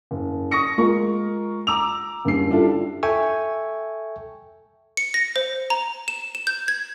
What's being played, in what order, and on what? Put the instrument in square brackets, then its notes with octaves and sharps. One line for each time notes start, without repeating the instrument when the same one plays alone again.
[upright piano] F#1
C#6 D#6 A#6 C#7
G#3 F4 A#4 C#6
A#5 D6 E6 F7
F#1 G2 C7
G3 D4 E4 F4 A4
[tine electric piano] A4 E5 G5 G#5 C#6
[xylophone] C#7
A#6
C5
A#5
E7
E7
G6
G#6